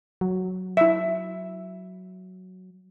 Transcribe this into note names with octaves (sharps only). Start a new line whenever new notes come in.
F#3
E4 E5